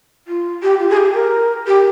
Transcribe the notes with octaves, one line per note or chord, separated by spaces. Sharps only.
F4
G4
F4
G#4
G4
A#4
G4